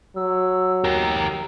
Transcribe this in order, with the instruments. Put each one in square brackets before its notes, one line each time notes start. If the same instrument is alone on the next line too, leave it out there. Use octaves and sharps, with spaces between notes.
[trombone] F#3 [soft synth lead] E6
[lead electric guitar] G4 A#4 [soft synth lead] A#5